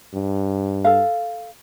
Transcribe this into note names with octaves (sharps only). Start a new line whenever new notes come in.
G2
A4 F5